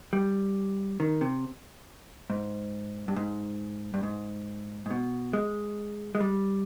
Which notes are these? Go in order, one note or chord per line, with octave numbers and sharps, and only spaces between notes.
G3
D#3
C3
G#2
G2
G#2
G2
G#2
G#2
B2
G#3
G#3
G3